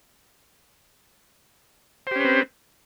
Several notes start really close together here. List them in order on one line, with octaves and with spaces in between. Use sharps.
C5 G4 C#4 B4 C4